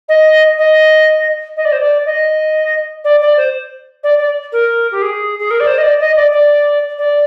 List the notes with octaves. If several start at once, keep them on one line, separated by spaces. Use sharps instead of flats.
D#5
D#5
D#5
D5
C5
D5
D#5
D5
D5
C5
D5
D5
A#4
G4
G#4
G#4
A#4
D5
C5
D#5
D5
D#5
D5
D5
D5